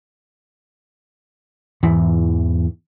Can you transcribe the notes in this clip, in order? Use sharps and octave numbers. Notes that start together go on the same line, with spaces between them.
E2 G#2 E3